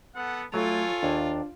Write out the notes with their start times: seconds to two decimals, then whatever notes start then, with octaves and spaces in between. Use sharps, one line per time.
0.15 B3 A4 F#5
0.54 F#3 A3 F4 A4 C#5 G#5
1.03 D#2 D4